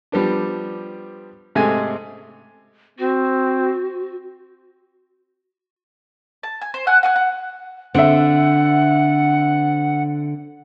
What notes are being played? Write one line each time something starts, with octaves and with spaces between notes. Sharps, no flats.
F3 G3 B3 D4
G#2 C3 A3 G#4 D#5 G#5
C4 F#4
A5
G#5
C5
F#5 G#5 F#6
F#5 G#5 F#6
F#5
D3 C4 E5 F#5